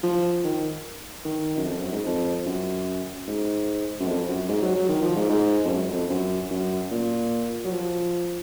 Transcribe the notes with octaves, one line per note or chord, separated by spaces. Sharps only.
F3
D#3
D#3
F#2
F2
F#2
G#2
F2
F#2
G#2
F#2
F2
F#2
G#2
F#3
F#3
D#3
F3
G#2
G#2
F2
F#2
F2
F#2
F#2
A#2
F#3
F3